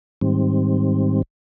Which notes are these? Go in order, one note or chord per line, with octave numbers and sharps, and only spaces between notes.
G#2 D#3 G3 C4